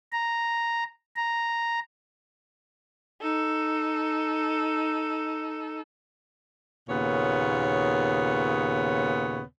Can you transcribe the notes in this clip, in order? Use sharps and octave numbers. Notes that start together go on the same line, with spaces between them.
A#5
A#5
D#4 A4
D#2 A#2 C#3 B3 C#5